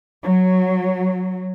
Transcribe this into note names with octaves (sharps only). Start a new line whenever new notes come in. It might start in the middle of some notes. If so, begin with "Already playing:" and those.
F#3